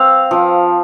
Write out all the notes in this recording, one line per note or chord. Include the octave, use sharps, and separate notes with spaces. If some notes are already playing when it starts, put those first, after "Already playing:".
Already playing: C4 F5
F3